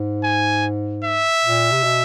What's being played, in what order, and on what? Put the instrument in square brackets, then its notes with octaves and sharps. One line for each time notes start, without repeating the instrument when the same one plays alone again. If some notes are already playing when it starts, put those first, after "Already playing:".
Already playing: [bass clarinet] G#2
[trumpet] G#5
E5
[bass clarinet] A#2
C3
B2